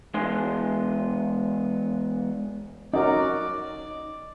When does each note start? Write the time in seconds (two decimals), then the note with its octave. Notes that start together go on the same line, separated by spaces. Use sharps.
0.14 E3 G#3 B3 D4 C6
2.93 C#4 D#4 F#4 A#4 D5 D#5